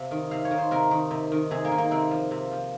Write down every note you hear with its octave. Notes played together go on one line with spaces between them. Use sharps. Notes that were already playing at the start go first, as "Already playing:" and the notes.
Already playing: C3 F5
D#3
C3 F5
C#5
D#3
C5
C3 A#4
D#3
C3
D#3
C3 G#4
A#3
D#3
A#3
C3 C4
F3
C3
F3